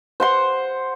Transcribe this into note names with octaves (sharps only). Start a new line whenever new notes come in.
C5 F#5 C6